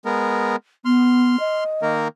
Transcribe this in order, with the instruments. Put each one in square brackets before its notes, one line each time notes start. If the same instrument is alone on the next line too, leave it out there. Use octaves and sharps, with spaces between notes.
[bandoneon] G#3 B3 A#4
[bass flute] B3 [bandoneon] C6 F6
[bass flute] D#5
[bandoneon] D#3 A#3 A#4